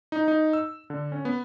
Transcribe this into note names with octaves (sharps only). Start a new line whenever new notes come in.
D#4
D#4
E6
D3
C#4
B3